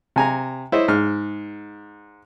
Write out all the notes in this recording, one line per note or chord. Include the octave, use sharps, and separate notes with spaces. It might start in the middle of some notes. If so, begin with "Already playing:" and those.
C3 G#5 A#5
E4 C5 C#5 D#5
G#2 F6